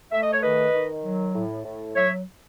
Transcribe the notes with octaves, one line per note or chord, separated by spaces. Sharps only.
A3 E5
D#5
C#5
D#3 B4 D#5
D#3
F#3
A2
A2
F#3 C#5 E5